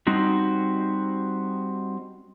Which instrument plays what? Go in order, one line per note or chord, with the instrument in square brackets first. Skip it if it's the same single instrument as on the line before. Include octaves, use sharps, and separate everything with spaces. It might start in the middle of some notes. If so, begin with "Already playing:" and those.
[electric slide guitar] G3 C4 D#4 F#4